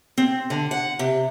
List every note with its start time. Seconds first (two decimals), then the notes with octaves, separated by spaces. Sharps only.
0.18 C4
0.50 D3
0.71 F#5
0.99 C3